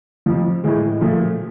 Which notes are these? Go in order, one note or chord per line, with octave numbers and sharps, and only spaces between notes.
F2 C3 F3
A2 E3 G#3
A#2 F3 A3